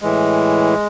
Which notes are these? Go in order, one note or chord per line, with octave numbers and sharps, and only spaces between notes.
A2 E3 G#3